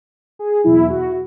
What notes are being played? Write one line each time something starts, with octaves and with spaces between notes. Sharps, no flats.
G#4
E2 B2 F#3 E4
F#4